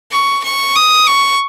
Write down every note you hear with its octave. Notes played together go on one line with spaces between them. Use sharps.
C#6
C#6
D#6
C#6